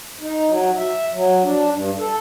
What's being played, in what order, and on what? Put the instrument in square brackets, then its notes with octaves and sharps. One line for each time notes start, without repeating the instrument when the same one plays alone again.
[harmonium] D#4
F#3
E5
F#3
D4
G2
A4